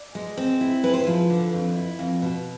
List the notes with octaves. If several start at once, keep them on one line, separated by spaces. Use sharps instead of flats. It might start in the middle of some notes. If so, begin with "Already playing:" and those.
Already playing: D5
G#3
C4
E4
G#3 B4
C5
F3 B4
D3
F2
E4
F2
B2